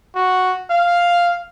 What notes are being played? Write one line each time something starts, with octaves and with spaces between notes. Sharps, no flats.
F#4
F5